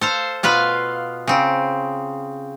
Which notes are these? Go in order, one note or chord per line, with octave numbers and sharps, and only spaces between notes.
A4 C5 F5
B2 F4 B4 F5
C#3 C4